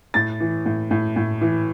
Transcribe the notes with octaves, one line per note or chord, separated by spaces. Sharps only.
A2 A6
E3
A2
A2
A2
E3